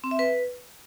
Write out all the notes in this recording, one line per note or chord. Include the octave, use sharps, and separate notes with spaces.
C4
E5
B4